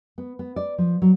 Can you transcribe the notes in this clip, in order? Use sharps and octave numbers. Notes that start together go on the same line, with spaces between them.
B3
B3
D5
F3
F#3